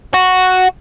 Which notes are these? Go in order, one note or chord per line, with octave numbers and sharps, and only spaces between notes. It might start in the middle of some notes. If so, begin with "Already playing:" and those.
F#4